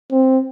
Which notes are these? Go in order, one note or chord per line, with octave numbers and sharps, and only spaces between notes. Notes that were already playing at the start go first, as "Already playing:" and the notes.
C4